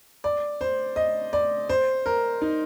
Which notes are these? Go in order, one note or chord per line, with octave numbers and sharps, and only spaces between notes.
D5
C5
D#5
D5
C5
A#4
D#4